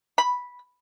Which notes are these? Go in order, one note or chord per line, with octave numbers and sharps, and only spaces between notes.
B5